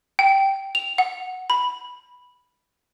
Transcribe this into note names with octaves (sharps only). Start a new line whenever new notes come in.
G5
F7
F#5
B5